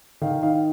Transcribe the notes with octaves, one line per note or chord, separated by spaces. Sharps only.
D#3 F5
D#4 F5